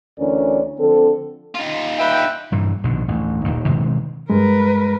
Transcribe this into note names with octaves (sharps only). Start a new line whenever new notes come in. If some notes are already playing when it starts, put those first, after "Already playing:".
D2 E3 C#4 D4 A#4 D5
D3 F3 C4 A4
D#4 F4
B4 E5 G5
G2 A#2 E3
A#1 B2 D3 D#3
A1 D2
D#1 D#2 A#2 D#3
B2 D#3 G#3 C4
G2 G#3 A#4 B4